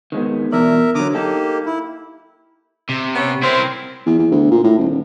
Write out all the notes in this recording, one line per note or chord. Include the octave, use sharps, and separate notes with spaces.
D#3 G#3 B3
B2 E3 A#4 D5 E5
D3 F#3 A#5 D6 D#6
A#3 D#4 G4 A4
E4
C3
B3 C#4
C4 E4 A#4
E2
E2
D2
A#2
A2
D#1
D#1